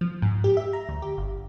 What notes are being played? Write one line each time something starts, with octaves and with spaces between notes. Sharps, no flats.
F3
G#2
G4
E5
A#5
D2
G4
G1